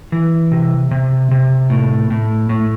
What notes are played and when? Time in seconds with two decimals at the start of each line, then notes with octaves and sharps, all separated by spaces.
0.12 E3
0.52 C3
0.91 C3
1.31 C3
1.70 A2
2.10 A2
2.49 A2